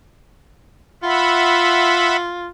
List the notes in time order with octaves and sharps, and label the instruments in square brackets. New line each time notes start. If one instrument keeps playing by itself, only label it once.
[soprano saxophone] F4 [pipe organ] E5 F#5 B5